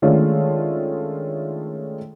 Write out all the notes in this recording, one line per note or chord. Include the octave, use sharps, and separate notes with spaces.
D#3 G#3 A3 C#4 D4 F4